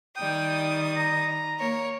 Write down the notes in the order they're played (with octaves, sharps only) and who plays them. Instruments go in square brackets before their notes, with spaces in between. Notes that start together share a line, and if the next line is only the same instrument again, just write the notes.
[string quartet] D#3 G3 D#6 [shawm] G5
[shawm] A#5
[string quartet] A#3 A#4 C#5